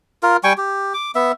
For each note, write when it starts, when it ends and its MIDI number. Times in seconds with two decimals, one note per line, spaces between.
0.23 0.37 65
0.23 0.37 70
0.44 0.53 55
0.44 0.53 79
0.44 0.53 80
0.44 0.53 85
0.58 0.93 67
0.94 1.11 86
1.15 1.32 59
1.15 1.32 76